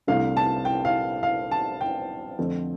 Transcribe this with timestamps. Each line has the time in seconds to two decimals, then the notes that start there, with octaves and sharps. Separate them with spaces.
0.07 C2 C3 A3 D4 F5
0.37 A5
0.65 G5
0.85 F5
1.23 F5
1.51 A5
1.81 G5
2.38 F2 D3 A3 C4